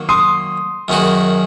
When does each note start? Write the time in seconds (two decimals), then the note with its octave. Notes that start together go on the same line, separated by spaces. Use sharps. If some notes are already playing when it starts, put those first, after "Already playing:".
Already playing: D#3 F#3 A#3
0.09 C6 D#6
0.88 F#2 D#3 G#3 D#4 F#4